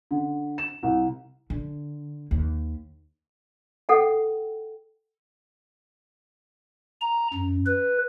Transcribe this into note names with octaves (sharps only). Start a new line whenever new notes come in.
D3
E7
C2
D3
D#2
A4 F#5 G5
A#5
F#2
B4